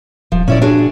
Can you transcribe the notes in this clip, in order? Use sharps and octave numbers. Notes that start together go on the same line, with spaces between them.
D#1 F3
A#2 C#4 E4 D5
D4 F#4 G#4